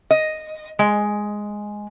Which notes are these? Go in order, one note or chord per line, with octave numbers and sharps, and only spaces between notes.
D#5
G#3